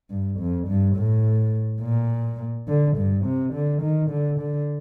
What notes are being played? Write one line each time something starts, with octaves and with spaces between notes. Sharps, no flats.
G2
F2
G2
A2
A#2
D3
G2
C3
D3
D#3
D3
D3